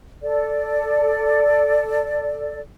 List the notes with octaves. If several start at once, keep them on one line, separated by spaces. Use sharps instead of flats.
A4 D5